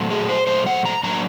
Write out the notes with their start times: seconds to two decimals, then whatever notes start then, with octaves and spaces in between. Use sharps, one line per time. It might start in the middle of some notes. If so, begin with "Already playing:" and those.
Already playing: A#2 F#3 A3
0.10 G#4
0.29 C5
0.47 A#2 F#3 A3 C5
0.67 F#5
0.85 A#5
1.03 A2 F#3 A#3 D4 A#5